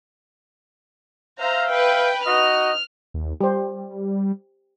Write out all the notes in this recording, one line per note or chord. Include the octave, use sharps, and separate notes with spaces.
C5 E5 F5 A#5
B4 G5
D#4 F#4 D#5 F6
D#2
G3 G4 C5